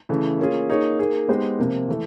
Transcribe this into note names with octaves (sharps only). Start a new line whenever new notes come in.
C#3 E3 A3
A#3 C#4 F4 G#4
A#3 D#4 G#4 C#5
A#3 D#4 G#4
G#3 B3 D#4 G4 C5
C3 F3 A#3
E3 A3